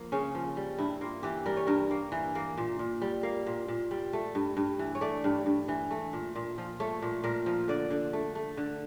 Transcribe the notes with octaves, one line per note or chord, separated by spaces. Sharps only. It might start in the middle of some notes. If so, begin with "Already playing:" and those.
Already playing: F3 A#3
C#3 C#4
F3
G3
G2 E4
A#3 F4
E3 G4
G3 A#4
C#5
G2 A#4
A#3
E3
A#3
A#2
A#2
G3
A#3 F5
A#2
A#2
G3
A3
G2
G2
E3
C#5
A3 D5
G2
G2
E3
A3
A#2
A#2
F3
A3 C#5
A#2
A#2 A#4
F3
D3 D5
D3
A3
A3
D3